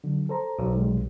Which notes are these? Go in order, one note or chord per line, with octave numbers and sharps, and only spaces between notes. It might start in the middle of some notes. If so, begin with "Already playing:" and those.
D3 F#3
A4 C5 A#5
B1
C3 G3 G#3